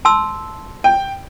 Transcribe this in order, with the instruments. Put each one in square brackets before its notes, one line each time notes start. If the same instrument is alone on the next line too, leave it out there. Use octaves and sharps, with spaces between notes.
[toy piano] A5 C6 E6
[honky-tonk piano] G5